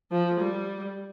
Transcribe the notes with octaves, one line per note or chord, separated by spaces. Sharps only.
F3
G3